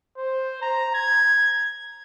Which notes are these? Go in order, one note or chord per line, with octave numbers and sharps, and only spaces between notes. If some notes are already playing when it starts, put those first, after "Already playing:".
C5
A#5
G#6